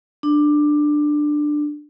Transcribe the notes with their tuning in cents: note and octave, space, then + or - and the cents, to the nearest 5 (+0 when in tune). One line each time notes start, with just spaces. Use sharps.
D4 +15